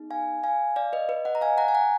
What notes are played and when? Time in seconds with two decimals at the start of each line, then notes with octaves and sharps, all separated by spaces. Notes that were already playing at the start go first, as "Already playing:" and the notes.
Already playing: B3 D#4 G#4
0.10 F5 G#5
0.43 F5 G#5
0.76 D5 F5
0.93 B4 D#5
1.09 B4
1.25 D#5 F#5
1.35 A#5
1.41 F5 G#5
1.58 F#5 A#5
1.68 G#5
1.75 F#5 A#5